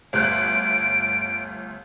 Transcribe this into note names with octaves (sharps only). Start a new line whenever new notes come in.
G1 D2 F#6 D7